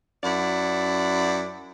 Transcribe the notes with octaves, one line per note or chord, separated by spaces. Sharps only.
F#2 E4 D5 F#5